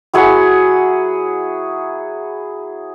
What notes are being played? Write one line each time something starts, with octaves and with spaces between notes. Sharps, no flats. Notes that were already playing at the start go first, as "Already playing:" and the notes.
F#3 E4 G#4 F#5